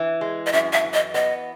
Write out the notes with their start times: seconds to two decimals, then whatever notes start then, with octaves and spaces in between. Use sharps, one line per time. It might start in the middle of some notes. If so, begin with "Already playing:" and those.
Already playing: E3
0.21 G#3
0.47 D#5
0.52 F#2 E5
0.73 E5
0.84 E3
0.94 D#5
1.14 B3 D#5